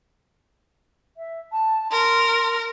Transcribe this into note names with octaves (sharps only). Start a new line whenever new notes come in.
E5
A5
A#4 C6